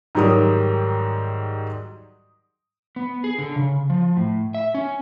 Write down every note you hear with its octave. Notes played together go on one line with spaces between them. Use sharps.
G#2 D#3 F#3 G3 A#4 D#6
B3
G#4
D3
C#3
F3
A2
E5
C#4